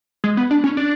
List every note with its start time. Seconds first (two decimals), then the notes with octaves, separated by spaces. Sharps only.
0.24 G#3
0.37 B3
0.51 D4
0.64 C#4
0.77 D4